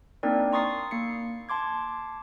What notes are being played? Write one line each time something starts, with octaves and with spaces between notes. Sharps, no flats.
A#3 C4 D4 D#4 A#4 D5
A#5 C6 C#6 D#6 A6 C7
A#3 C7 C#7
A5 C6 D6 G#6